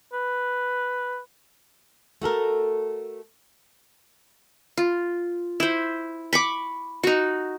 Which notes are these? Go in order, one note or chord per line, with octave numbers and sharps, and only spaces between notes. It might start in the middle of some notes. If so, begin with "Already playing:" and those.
B4
A3 F#4 A4 A#4
F4
E4 C5
B5 C#6 D6
D#4 F#4